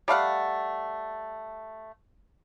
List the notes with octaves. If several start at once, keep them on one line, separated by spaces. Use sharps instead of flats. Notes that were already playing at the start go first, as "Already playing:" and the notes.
G3 A3 F5 F#5